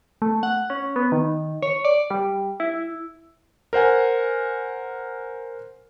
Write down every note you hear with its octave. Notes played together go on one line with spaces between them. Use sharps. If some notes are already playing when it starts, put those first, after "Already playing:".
A3
F#5
C#4
B3
D#3
C#5
D5
G3
E4
A#4 C5 F#5 G#5